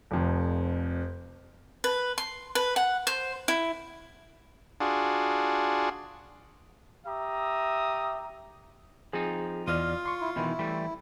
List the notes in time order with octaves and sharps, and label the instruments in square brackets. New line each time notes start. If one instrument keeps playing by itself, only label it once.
[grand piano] F1 F2
[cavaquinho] B4
C6
B4
F#5
C5
E4
[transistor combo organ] D4 F4 F#4 G#4
[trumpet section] G4 E5 A#5 D#6
[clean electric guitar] F3 C4 D#4 [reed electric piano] G#4
[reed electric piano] E2 D5 F6 [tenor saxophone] F4 [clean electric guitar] D#5
[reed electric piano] C6 C#6
[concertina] E4
[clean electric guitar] B2 D#3 E3 [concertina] E4
[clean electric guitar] E3 G3 A3